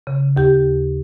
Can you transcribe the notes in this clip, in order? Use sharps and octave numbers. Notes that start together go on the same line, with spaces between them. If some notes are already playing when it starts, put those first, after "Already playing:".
C#3
D#2 G4